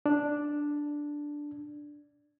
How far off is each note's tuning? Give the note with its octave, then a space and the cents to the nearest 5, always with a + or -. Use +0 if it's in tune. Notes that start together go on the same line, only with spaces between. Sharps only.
D4 +0